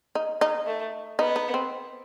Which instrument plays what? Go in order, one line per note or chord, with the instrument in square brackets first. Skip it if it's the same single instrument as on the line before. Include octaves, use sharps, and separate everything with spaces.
[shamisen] D#4
D#4
[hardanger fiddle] A3
[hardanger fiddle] B3 [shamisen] D#4
[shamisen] D#4
C4